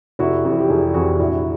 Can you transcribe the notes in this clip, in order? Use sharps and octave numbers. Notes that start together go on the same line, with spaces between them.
F1 E4 F#4
F2 C3 E3
G4
F1 F#4 G#4
F2 C3 E3 F#4 G#4
A#1 E4 F#4